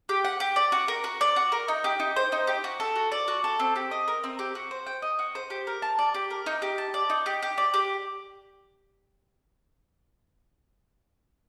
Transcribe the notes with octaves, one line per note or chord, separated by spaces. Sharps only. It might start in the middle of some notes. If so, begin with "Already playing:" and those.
G4
F#5
G4
D5
F#4
A#4
F#4
D5
F#4
A#4
D#4
G4
D#4
C5
D#4
G4
F#4
A4
F#4
D5
F#4
A4
C4
G4
D#5
A#4
C4
G4
F#4
C5
G5
D#5
F#4
C5
G4
A#4
A5
D5
G4
A#4
D#4
G4
A5
D5
D#4
G4
G4
D5
G4